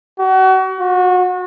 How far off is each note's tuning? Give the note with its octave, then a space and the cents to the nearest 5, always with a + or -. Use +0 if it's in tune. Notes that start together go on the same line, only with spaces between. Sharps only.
F#4 +35
F#4 -30